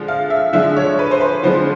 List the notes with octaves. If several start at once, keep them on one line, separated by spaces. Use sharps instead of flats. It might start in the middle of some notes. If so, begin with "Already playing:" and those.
Already playing: D3 F3 G#3
F5
E5
D3 F3 G#3 E5
C#5
B4
C5
B4
D3 F3 G#3 C5